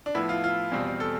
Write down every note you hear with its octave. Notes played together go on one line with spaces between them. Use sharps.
D4
A2 F3 B3 E4
F4
F4
E2 B2 G3 C4
A4